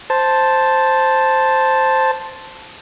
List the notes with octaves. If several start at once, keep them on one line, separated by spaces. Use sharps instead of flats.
C5 A5